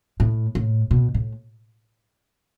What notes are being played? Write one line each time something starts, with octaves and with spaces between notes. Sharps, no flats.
A2
A2
B2
A2